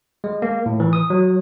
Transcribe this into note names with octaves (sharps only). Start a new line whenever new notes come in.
G#3
A#3
A2
E3
D#6
F#3